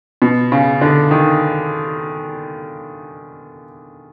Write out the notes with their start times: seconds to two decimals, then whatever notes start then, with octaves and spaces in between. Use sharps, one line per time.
0.22 B2
0.52 C#3
0.81 D3
1.11 D#3